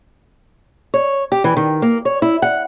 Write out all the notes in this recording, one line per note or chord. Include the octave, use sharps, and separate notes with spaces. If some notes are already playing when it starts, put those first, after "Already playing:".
C#5
G4
E3
D#3
A#3
C#5
E4
F#5